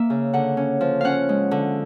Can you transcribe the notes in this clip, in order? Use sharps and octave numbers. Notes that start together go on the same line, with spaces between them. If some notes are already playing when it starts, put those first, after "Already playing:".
Already playing: A#3 E5
C#3
D3 F#5
C#4
F3
C#4 F5 F#5
G#3
D3